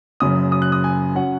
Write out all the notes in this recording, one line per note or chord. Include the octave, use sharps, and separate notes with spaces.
F#1 F#2 C#3 D#6
D#6
F#6
D#6
G#5
F#3 C#4 F#5